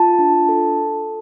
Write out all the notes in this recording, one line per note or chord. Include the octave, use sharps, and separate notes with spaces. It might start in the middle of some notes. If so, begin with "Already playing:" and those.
Already playing: F4 A5
D4
A4